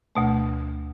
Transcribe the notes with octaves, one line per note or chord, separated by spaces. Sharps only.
D2 B2 A3